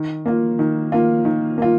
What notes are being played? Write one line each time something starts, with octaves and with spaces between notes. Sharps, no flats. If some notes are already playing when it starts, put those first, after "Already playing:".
Already playing: D#3
A#3 F4
D#3
A#3 F4
D#3
A#3 F4